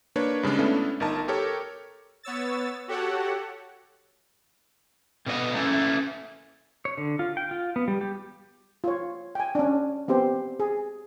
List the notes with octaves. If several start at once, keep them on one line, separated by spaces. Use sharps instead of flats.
A#3 D4 B4 C#5
G2 C#3 G#3 D4
A3 B3 C#4 D4 E4 A4
G1 D#4 A#4 A5
G4 A4 A#4 C#5
B3 C#5 E6 A6
F#4 G4 A4 C#5 F#5
B2 D3 B3 D#5
A3 A#3 C#4 E4
C#5
D3
F4
G5
F4
B3
G3
G4
F4 C#5
G5 G#5
C#4 D4
B3 C4 G4 C5
G#4